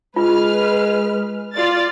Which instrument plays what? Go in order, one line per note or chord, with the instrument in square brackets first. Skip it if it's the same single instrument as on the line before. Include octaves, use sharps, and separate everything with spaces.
[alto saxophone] G#3 [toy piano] F4 [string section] B4 F6
[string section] F4 D5 A6